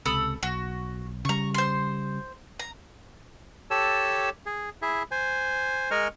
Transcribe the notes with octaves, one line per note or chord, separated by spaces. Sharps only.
C#2 C3 A4 B5 D#6
B1 F#4
C#3 G3 A#5 C#6
C5 C6
A#5
G4 A4 C#5 A5 E6
G#4
E4 G#4 E5
C5 G#5
G#3 A#4 D#5 G#5 C#6 F6